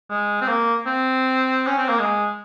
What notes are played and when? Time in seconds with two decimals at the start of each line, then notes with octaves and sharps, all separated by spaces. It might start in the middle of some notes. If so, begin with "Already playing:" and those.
0.10 G#3
0.41 C4
0.48 A#3
0.86 C4
1.67 C#4
1.78 C4
1.89 A#3
1.99 G#3